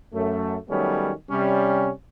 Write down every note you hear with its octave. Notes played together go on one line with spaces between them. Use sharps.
F#2 A3
D#3 F#3 G3 A3 B3 C#4
C3 G3 C#4